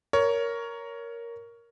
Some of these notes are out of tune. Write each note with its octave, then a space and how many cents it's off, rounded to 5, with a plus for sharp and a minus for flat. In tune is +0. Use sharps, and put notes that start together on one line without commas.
A#4 +0 C#5 +15